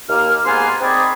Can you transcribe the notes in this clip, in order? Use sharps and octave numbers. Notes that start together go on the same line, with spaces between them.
D#2 A#3 F6
G#2 A#3 B3 G#5 C6
C4 D#4 G#4 D5 B5